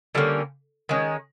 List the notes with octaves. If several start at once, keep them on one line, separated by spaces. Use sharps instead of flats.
D3 G3 A#3 C#4
D#3 G#3 C#4